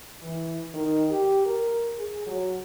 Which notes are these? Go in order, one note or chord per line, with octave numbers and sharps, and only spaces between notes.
E3
D#3
G4
A#4
G#4
F#3